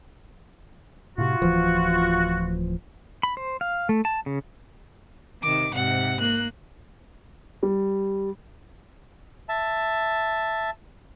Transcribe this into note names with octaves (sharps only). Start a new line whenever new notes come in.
A2 C3 F4 F#4
D1 E3 F3
B5
C5
F5
A3
A5
C#3
C3 D#3 D6
G#2 C3 F#5
A#3 F#6
G3
E5 A5